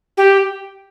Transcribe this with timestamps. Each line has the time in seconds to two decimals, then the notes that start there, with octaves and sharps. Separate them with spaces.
0.17 G4